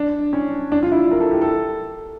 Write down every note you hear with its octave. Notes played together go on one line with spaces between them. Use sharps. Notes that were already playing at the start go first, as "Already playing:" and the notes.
Already playing: D4
C#4
D4
F4
E4
A#4
A4
G4
A4